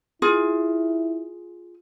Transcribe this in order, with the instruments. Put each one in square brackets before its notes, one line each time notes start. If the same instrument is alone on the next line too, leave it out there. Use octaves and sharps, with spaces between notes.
[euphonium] E4 [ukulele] F4 G#4